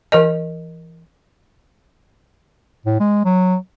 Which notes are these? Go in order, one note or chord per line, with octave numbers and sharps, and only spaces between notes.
E3 A#4 D#5
A2
G#3
F#3